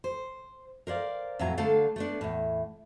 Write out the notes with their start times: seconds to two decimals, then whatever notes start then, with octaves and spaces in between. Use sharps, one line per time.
0.04 C5
0.87 A#4 C5 D5 F5
1.39 F2 A2 F#3 A3 G#5 A#5
1.58 D3 G3 A3 A4 F5
1.96 A3 B3 D4
2.21 E2 A2